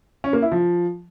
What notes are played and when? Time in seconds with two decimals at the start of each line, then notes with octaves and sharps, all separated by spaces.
0.24 C#4
0.33 A#3
0.42 E4
0.52 F3